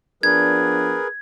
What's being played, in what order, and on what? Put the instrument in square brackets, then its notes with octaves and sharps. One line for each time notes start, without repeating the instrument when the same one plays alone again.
[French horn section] F3 B3 D4 [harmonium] G#4 A#4 B4 [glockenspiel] G#6